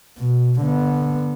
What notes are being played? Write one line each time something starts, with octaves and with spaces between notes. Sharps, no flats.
B2
D3 B3